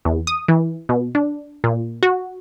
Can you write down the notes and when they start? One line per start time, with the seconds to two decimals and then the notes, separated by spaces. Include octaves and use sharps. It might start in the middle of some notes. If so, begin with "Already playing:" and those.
0.05 E2
0.27 D#6
0.48 E3
0.89 B2
1.15 D4
1.64 A#2
2.03 F#4